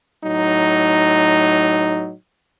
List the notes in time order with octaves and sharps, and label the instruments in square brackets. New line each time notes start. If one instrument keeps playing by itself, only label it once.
[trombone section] A2 F#3 D#4